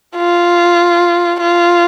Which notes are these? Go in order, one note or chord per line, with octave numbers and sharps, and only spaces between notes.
F4
F4